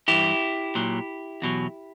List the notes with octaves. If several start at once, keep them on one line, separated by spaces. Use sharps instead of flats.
G2 E3 E4 G4
A#2 F#3
E2 B2 F#3